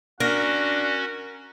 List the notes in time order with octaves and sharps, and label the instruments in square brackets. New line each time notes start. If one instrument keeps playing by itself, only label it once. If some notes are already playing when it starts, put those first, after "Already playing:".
[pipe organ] C#4 F#4 [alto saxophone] D4 [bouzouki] A#4 [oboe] F#5